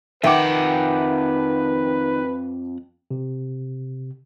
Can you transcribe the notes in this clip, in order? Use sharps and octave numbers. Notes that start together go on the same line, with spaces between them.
F2 D#3 B4 E5 F#5 G5 D6
C3